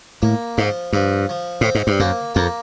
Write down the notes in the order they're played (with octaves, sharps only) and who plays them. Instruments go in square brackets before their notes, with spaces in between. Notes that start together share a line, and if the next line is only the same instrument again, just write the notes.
[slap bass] A2 [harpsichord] A#3
[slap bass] G#2 [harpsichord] F3
[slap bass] G2 [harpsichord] F3
[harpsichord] F3
[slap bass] A2 [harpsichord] C4
[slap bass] G#2
G2
[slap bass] F#2 [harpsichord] A#3
[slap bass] F2 [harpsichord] A#3